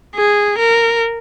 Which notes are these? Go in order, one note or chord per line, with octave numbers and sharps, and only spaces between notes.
G#4
A#4